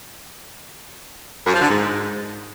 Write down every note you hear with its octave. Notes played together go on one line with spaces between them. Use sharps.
F#2
F3
D3
G#2